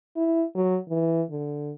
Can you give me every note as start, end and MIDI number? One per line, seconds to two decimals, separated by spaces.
0.17 0.44 64
0.55 0.78 54
0.89 1.22 52
1.31 1.72 50